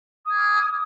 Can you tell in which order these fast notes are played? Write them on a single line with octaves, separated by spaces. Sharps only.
D#6 G#6 D6 F6